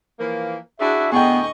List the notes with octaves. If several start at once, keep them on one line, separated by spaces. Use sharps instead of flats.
E3 F3 A#3
D4 E4 F#4 G#4 E5
D2 A2 B3 G#4 D#5 G5 G#5 C#6